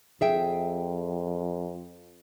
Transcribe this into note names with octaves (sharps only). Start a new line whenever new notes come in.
F2 G#4 E5 G5